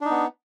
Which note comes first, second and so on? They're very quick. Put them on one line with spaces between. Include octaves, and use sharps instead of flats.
D4 D#4 B3